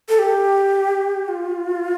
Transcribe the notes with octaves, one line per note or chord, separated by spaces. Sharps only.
A4
G4
F4